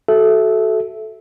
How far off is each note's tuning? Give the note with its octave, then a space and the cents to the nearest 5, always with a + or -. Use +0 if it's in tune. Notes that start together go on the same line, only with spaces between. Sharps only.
F#4 +15 A4 -15 E5 +0